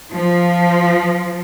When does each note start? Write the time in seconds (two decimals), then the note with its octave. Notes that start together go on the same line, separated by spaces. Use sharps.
0.13 F3